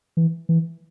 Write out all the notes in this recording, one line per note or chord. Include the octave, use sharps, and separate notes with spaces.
E3
E3